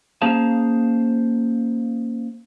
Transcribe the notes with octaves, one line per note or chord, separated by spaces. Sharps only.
A#3 C#4 G#4 C5 F5 A5